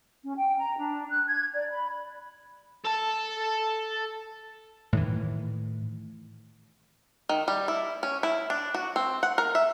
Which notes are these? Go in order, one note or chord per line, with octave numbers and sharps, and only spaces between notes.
C#4
G5
A#5
D4
F#6
G#6
D5
B5
A4 A5
A2 D#3 E3
D#3
G3
E4
C#4
E4
D4
F#4
C4
F#5
A#4
E5